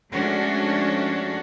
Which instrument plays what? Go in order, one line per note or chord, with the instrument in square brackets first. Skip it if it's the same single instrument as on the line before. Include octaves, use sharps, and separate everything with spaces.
[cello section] F3 G#3 A3 C#4 D4 F#4